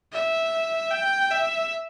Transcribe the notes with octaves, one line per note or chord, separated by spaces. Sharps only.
E5
G5
E5